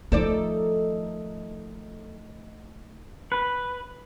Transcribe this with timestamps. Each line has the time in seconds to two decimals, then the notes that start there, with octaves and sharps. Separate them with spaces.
0.12 F3 A3 D#4 A4 C5 D5
3.32 B4